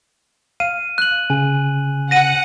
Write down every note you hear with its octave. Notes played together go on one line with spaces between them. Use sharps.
F5 D#7
F#6 F#7
C#3 G#5
F#5 A#6 D#7